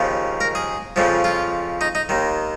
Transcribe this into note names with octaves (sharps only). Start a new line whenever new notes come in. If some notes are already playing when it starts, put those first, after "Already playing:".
Already playing: D#2 C#3 F3
A#4
G#4
F2 C#3 F3
F4
D#4
D#4
D#2 D#3